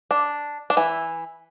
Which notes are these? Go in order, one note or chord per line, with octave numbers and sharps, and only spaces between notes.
D4
D4
E3 E4